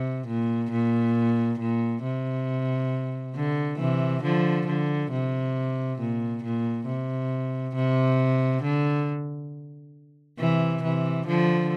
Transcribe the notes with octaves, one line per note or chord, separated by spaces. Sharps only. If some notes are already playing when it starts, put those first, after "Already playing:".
Already playing: C3
A#2
A#2
A#2
C3
D3
C3 E3
D3 F3
D3
C3
A#2
A#2
C3
C3
D3
C3 E3
C3 E3
D3 F3